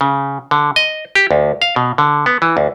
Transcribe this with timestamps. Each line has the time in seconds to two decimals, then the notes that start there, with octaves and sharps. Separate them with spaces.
0.01 C#3
0.51 D3
0.76 D#5
1.15 G4
1.31 D2
1.62 F5
1.76 B2
1.98 D3
2.26 B3
2.42 E3
2.57 D2